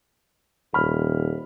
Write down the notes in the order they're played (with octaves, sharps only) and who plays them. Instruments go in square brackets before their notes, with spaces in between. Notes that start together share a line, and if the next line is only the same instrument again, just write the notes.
[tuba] D#1 [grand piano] B5 F6